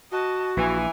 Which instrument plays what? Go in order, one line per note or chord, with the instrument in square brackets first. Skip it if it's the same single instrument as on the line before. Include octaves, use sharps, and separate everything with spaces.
[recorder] F#4 [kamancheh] D#5 A5
[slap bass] A#1 [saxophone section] E3 [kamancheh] G#5